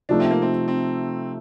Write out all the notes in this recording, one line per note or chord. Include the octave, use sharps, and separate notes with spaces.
C3 F3 A3 D4 D#4
C4
A#3
C4
C4